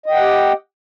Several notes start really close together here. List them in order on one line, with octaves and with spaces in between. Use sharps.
D#5 G5 F#5 G4